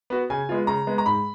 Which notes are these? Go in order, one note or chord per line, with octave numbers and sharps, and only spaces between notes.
B3 F#4
C#3 G#5
G#3 B3 F4
C#3 A#5
G#3 B3
A#5
G#2 B5